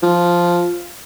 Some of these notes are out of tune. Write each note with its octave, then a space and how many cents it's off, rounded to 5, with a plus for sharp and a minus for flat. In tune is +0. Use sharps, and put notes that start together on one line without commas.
F3 +0